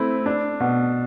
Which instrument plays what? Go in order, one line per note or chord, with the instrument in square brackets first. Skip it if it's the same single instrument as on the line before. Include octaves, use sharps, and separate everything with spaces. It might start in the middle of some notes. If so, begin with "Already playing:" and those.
Already playing: [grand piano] A3 C4 E4
D4
B2